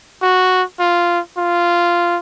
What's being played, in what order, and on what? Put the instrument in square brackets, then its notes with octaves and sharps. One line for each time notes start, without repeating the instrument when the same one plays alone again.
[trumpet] F#4
F4
F4